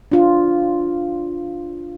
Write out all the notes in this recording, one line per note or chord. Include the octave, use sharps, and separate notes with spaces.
D4 F4